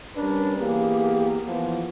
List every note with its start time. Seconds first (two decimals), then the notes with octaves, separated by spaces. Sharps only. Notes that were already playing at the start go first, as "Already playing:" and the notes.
0.17 G3 C#4 D4 A#4 B4
0.57 E3 A#3 B3 G4 G#4
1.45 E3 F3 B3